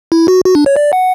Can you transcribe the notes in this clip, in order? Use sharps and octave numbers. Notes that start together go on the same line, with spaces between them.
E4
F#4
F#4
D4
C#5
D5
F#5